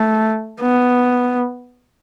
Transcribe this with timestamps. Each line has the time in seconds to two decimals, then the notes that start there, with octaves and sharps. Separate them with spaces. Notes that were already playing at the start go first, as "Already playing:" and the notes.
Already playing: A3
0.61 B3